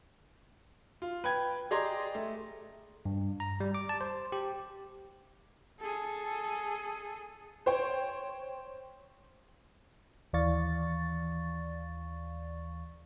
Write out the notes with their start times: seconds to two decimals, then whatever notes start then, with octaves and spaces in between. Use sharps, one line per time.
1.02 F4
1.24 B4 G5 G#6
1.71 G4 G#4 D5 D#5 A#5 C6
2.15 A3
3.05 G2
3.40 A#5
3.60 G3
3.75 D6
3.89 A5
4.01 C5
4.32 G4
5.80 G#4 A4
7.66 C5 C#5 G5
10.33 D#2 E3 D5 F5 C#6 A6